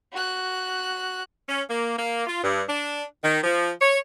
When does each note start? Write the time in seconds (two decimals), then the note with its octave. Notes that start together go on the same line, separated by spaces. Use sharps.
0.13 F#4 F#6
1.48 C#4
1.69 A#3
1.99 A#3
2.27 F4
2.43 G2
2.68 D4
3.24 D#3
3.44 F3
3.80 C#5